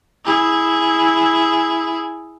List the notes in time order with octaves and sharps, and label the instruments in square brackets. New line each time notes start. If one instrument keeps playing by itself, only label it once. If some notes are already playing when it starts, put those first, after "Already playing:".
[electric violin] E4 G#4